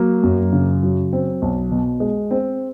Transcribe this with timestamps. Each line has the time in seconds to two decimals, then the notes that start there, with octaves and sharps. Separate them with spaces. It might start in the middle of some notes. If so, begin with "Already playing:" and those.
Already playing: F#3 A#3
0.23 F#2
0.53 C#3
0.83 F#3
1.13 C4
1.42 B1
1.71 B2
2.00 G#3
2.31 C4